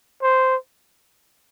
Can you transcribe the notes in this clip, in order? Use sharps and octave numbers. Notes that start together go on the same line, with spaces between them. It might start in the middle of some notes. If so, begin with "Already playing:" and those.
C5